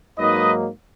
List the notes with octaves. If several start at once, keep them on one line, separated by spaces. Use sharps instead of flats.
G#2 F#3 A#3 D#4 B4 D#5